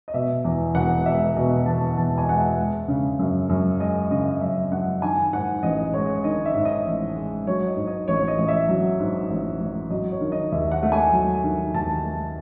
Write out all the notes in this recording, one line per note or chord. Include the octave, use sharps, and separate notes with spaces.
D#5
B2 E5
E2
E1 F#5
G#3 E5
B2 D#5
E2 A5
E1 A5
G#5
G#3 F#5
E5
G#3
C#3
F#2
F#2
G#3 D#5
C#3 D#5
F#2 E5
F#2 F#5
D#3 G#5
G#2 F#5
A1 D#5
G#3 C#5
D#3 D#5
E5
G#2
D#5
A1
G#3
F#3 C#5
D#5
G#2
D#5
A1 C#5
C#5
D#5
A1
E5
F#3
G#2
A1
A1
F#3 D#5
C#5
D#3
D#5
D#2 E5
F#5
A3
G#5
F#3
D#3
D#2 A5
A3